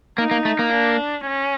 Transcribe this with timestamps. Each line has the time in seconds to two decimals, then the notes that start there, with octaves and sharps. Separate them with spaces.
0.18 A#3 D#4
0.31 A#3
0.45 A3
0.59 A#3
0.72 D4
1.26 C#4